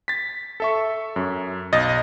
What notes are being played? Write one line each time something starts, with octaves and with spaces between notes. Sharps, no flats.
A6 B6
A4 E5 C#6
F#2
B1 D#5 A6